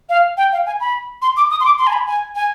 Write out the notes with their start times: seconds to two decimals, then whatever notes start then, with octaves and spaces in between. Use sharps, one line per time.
0.09 F5
0.37 G5
0.52 F5
0.66 G#5
0.80 B5
1.22 C6
1.37 D6
1.51 D#6
1.60 C6
1.65 D6
1.78 C6
1.87 G#5
1.93 B5
2.07 G#5
2.35 G#5